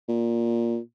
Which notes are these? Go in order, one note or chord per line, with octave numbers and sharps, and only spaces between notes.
A#2